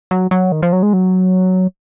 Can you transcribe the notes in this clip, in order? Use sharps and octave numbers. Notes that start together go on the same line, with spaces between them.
F#3
F#3
D#3
F3
F#3
G#3
F#3